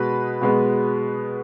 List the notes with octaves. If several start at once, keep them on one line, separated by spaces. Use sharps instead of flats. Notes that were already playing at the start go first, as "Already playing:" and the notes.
Already playing: B2 G#3 B3 B4
B2 G#3 B3